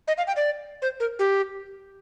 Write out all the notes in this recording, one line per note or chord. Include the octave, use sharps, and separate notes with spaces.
D#5
F5
G5
D5
C5
A#4
G4